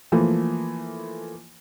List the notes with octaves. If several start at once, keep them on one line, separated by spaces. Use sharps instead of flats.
E3 F3 A3 A#3